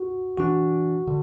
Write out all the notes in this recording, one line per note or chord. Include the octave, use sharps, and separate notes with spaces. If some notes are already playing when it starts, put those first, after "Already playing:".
Already playing: F#4
E3 D4 F#4
D3